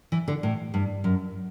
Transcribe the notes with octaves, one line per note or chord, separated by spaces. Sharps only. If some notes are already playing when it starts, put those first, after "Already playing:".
E3
D3
A2
G2
F#2